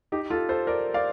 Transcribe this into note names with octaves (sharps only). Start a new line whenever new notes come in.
D#4 G4
F4 A4
A4 C5
A#4 D5
D5 F5